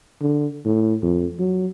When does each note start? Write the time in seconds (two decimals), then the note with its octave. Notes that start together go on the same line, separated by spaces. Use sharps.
0.21 D3
0.65 A2
1.03 F2
1.39 F#3